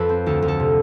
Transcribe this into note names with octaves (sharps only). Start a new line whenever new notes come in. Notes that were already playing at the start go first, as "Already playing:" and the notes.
Already playing: F2 A4 B4
C4
D2 A4
D2
A4
C3